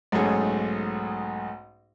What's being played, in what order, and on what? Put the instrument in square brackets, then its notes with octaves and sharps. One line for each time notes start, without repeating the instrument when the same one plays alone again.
[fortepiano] B1 G#2 A3 C#4 G#4